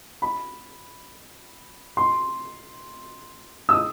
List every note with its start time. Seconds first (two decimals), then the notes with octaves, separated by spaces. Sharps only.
0.22 B5
1.97 C6
3.69 E6
3.73 D#6